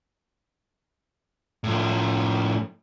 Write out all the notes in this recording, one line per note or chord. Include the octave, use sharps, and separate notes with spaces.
A2 F3